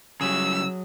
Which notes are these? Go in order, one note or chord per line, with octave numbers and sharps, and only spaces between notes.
C#3 F#3 G3 G#4 E6